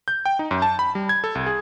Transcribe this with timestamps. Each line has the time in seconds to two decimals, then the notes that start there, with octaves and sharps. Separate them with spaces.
0.08 G6
0.26 G5
0.39 D#4
0.51 F#2
0.62 A5
0.79 B5
0.95 G3
1.09 G#6
1.24 A4
1.35 C2
1.46 G#4